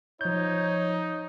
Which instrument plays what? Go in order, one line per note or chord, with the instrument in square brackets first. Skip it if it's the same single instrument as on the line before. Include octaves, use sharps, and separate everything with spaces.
[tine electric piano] F3 G6 [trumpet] D#4 [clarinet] C#5